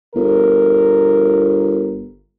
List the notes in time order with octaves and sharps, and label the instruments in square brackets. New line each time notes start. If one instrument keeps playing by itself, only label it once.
[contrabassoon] G1 [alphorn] A#4